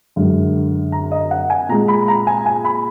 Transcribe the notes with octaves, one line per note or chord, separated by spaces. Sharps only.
F#2 D3 G#3
A#5
D#5
F#5
G#5
A#2 G#3 A#5
B5
A#5
G#5
G#5
B5